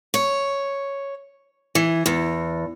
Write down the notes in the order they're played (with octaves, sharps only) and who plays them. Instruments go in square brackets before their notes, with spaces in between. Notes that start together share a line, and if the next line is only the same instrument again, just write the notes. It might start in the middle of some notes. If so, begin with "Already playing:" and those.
[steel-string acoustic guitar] C#5
E3
E2